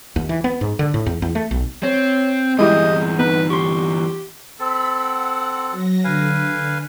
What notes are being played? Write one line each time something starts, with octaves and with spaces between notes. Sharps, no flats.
D#2
E3
B3
G#2
D3
A2
E2
E2
A3
B1
C4 C#5
E2 G2 G#3 E4 G4 G#4 D#5 G6
B3 D#4 B4
G4 C6 C#6
C4 A4 B5
F#5
F#3 A#6
D3 B4 F5 G#5